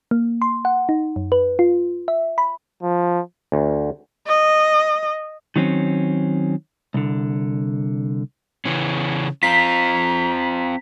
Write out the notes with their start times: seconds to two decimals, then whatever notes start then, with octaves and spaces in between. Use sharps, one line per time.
0.11 A#3
0.42 C6
0.65 F#5
0.89 D#4
1.16 F#2
1.32 B4
1.59 F4
2.08 E5
2.38 B5
2.83 F3
3.52 D2
4.27 D#5
5.56 D#3 F#3 C4 C#4
6.94 C2 D3
8.65 C#3 E3 C#4
9.43 C4 F4 A#5 B6